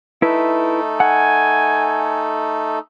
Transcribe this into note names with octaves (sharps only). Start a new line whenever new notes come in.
A3 D#4 E4 A4 B4
F#5 G#5